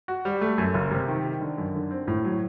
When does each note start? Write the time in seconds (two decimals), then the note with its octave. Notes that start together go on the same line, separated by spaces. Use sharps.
0.08 F#4
0.25 G3
0.41 A3
0.58 F#2
0.74 F#1
0.91 C3
1.08 D#3
1.25 D#3
1.41 D3
1.58 F#2
1.75 D3
1.91 C4
2.08 A2
2.25 F#3